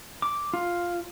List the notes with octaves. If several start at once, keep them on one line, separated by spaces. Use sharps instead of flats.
D6
F4